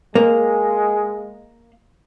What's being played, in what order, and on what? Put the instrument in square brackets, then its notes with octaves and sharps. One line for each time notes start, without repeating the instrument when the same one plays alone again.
[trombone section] G#3 [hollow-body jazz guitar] A#3